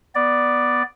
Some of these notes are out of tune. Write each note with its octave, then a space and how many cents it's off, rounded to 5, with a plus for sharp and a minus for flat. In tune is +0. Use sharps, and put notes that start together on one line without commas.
B3 +0 D5 +0